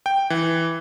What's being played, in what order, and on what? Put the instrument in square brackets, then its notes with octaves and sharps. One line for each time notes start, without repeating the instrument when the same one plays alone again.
[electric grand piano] G5
E3